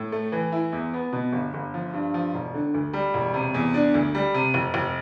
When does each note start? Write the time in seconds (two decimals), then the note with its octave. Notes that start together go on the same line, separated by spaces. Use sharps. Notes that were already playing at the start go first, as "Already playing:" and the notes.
Already playing: A2
0.12 A3
0.32 E3
0.52 E4
0.72 E2
0.94 B3
1.13 B2
1.33 G1
1.54 G1
1.74 F3
1.93 G2
2.14 F3
2.34 E1
2.54 D3
2.74 D2
2.93 G3
3.14 E1
3.34 C3
3.54 E2
3.74 D4
3.94 D2
4.15 G3
4.34 C3
4.54 F1
4.74 F1